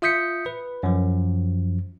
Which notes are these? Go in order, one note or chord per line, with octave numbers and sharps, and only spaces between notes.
F4 E5 D#6 G6 B6 C#7
B4
F#2 F3